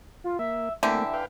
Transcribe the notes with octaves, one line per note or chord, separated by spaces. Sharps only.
F4
A#3 E5
D3 E3 A3 A#3 C4 G4 E5
B4 F5 G5